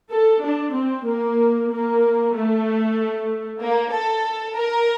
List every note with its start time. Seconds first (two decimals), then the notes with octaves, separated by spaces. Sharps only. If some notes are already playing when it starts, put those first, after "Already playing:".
0.11 A4
0.42 D4
0.74 C4
1.05 A#3
1.70 A#3
2.34 A3
3.61 A#3
3.93 A4
4.56 A#4